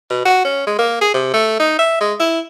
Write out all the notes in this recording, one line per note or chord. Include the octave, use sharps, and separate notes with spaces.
B2
F#4
C#4
G#3
A#3
G#4
C3
A3
D#4
E5
G#3
E4